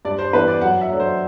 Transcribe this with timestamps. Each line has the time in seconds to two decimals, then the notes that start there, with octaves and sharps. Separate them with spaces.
0.05 G2 D5
0.19 C5
0.33 E3 B3 D4 B4
0.48 D5
0.61 F#2 F#5
0.81 E5
0.90 F#3 A3 D4
1.00 C5